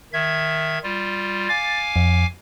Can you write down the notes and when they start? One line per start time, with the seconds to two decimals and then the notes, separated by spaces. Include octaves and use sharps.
0.13 D#3 E5 G#6
0.83 G3 F4
1.49 F5 G#5 D6 A6
1.96 F2